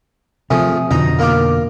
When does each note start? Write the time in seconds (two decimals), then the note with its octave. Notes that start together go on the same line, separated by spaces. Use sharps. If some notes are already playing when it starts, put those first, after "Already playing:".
0.51 C3 F3 A3 G#4
0.91 F2 B2 D3 D#4 A#5
1.19 A#3 F4 D6